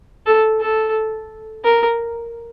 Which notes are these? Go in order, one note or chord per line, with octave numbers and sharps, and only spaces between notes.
A4
A4
A#4